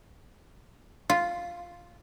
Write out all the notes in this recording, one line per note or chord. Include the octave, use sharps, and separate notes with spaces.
F4